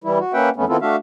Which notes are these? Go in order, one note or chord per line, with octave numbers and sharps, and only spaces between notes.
E3 G3 E4
F#4
A#3 C#4 B4 E5 F#5 G5
F2 A3 B3 C#4
D#3 B3 C4 E4 F4 A4
A3 D4 F#4 E5 F5